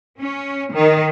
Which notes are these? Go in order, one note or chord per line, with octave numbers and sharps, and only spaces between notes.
C#4
D#3